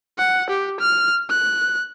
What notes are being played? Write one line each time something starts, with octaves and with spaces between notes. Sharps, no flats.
F#5
G4
F6
F#6